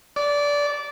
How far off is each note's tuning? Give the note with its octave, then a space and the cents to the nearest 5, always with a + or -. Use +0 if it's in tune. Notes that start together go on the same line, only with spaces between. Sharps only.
D5 -20